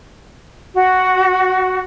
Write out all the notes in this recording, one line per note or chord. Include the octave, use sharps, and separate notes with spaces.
F#4